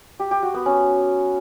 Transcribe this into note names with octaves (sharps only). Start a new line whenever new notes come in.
G4
G4
F#4
B3
C#4